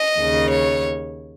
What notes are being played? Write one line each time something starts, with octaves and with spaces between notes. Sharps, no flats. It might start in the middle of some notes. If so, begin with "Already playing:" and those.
Already playing: D#5
D#2 C#3
C#5